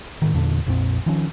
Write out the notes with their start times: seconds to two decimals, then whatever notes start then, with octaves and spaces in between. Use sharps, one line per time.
0.22 A2 C3 D#3
0.34 E2 A#2 D3
0.66 A#1 F2 A#2 C4
1.06 D#3 F3 C#4